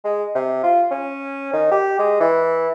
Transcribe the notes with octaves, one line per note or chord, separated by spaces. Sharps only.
G#3
C3
F4
C#4
D#3
G4
G#3
E3